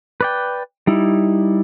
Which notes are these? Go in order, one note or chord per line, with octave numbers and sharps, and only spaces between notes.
B4 D5 G5
G3 D#4 E4